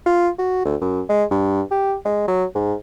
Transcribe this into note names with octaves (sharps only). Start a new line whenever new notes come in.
F4
F#4
D2
F#2
G#3
G2
G4
G#3
F#3
G#2